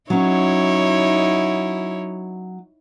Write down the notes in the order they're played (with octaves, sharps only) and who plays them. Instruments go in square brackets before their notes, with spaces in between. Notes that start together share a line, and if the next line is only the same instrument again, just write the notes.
[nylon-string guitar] F#3 C#4 [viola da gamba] D#4 E4 C#5